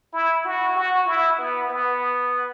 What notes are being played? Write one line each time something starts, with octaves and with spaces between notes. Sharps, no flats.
E4
F#4
F#4
E4
B3
B3